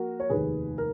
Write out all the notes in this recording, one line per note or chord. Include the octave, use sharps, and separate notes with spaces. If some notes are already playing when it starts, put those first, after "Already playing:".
Already playing: F3 A#3 F#4 A#4
C#5
F1 D#2 D#3 G#4 B4
A#4